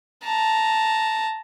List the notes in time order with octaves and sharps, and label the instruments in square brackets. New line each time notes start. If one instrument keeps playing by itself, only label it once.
[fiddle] A5 A#5